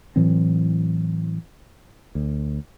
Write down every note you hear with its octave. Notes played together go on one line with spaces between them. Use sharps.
A2 E3 F#3 C4
D2